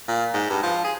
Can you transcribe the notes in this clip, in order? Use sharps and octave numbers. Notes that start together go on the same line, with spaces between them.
A#2
G#2
G2
F3
G#4